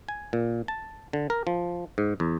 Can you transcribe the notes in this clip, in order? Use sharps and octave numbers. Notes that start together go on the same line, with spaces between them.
G#5
A#2
A5
D3
A#4
F3
G#2
E2